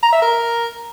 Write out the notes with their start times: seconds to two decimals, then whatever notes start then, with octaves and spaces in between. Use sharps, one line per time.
0.03 A#5
0.12 E5
0.22 A#4